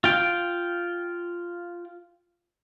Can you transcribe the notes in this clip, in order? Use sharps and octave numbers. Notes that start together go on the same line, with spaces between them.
F4 G5